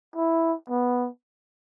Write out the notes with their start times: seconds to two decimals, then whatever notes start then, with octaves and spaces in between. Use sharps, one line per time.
0.16 E4
0.70 B3